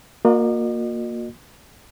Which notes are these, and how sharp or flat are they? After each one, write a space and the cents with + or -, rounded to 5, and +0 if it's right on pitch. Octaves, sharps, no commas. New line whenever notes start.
A#3 +0 F#4 -45 D#5 -40